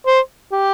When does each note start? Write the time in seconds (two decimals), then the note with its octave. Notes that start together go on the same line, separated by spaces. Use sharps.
0.06 C5
0.52 G4